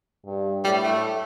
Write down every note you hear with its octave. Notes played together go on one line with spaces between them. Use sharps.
G2
A2 G3
A3